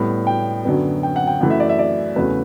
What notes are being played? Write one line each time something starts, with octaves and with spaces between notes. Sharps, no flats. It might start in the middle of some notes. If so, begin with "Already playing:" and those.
Already playing: A2 G3 B3
G5
F#2 D3 F#3 B3
G5
F#5
G5
F#2 E3 A3 F#5
E5
D5
E5
D5
E2 C#3 F#3 A3 B4